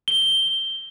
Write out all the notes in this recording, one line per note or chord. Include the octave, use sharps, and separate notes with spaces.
G7